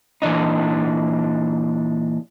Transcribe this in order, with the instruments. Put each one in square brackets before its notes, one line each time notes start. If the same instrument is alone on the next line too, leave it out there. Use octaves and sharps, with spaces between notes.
[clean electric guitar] A#2 E3 D4 D#4